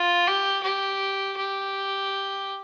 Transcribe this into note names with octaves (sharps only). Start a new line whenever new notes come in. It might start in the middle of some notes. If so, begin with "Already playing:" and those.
Already playing: F4
G4
G4
G4